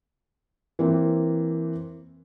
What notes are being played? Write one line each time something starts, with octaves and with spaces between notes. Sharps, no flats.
E3 A#3 C4